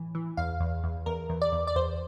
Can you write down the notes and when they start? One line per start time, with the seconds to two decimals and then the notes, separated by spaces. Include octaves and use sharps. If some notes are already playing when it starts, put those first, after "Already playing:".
Already playing: A2 E3
0.15 E3
0.37 E2 F5
0.60 E2
0.84 E2
1.06 E2 A#4
1.29 E2
1.42 D5
1.52 E2
1.67 D5
1.76 E2 C5